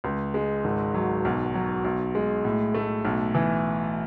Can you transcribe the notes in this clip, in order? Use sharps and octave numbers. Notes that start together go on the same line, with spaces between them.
C#2
G#3
G#1
F#3
B1
F#3
B1
G#3
A2
A3
B1
E3